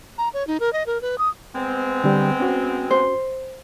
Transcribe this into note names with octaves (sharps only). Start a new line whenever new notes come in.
A#5
C#5
D#4
A#4
D#5
A#4
B4
D#6
G#3 B3 C4
D3 G3
C#4 F#4
C5